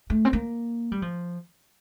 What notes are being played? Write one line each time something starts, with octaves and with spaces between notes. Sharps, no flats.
A3
C4
A#3
G3
F3